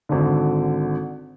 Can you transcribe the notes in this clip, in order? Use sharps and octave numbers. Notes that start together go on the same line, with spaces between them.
G#1 D3